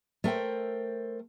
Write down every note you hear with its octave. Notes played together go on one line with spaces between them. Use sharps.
A3 A#4 C5 G5